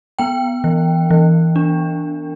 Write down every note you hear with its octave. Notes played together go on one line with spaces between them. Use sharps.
B3 G5
E3
E3
D4